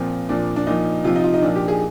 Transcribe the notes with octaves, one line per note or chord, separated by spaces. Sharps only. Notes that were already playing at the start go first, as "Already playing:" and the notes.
Already playing: A#2 F3 C4
A#2 F3 D4
D4
A#2 F3 D#4
C3 F3 F4
D#4
F4
D#4
A#2 F3 D4
G4
G#4